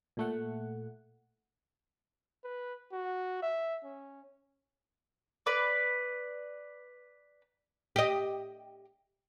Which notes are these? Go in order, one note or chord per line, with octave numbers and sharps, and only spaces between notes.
A#2 A3 F#5
B4
F#4
E5
C#4
B4 D5
G4 D#5